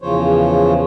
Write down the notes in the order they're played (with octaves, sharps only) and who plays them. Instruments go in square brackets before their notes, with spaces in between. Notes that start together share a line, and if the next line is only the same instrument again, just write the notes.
[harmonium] E2 C#3 F3 C5 C#5